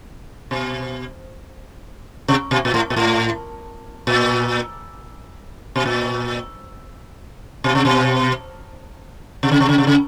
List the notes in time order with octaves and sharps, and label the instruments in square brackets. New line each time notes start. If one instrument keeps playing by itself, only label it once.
[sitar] B2
C3
B2
A#2
A2
A#2
A2
A#2
B2
A#2
B2
C3
B2
C3
C#3
C3
C#3
C3
C#3